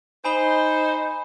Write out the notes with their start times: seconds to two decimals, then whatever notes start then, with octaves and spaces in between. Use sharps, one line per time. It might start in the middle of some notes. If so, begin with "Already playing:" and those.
0.25 D#4 C5 G#5 B5 G7